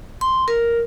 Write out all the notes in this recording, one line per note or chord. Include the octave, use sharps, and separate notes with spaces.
C6
A#4